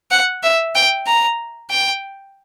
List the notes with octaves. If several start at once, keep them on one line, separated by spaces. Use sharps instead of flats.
F#5
E5
G5
A#5
G5